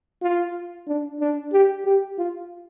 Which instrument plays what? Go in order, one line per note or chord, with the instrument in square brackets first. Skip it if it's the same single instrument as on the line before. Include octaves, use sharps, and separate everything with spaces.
[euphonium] F4
D4
D4
G4
G4
F4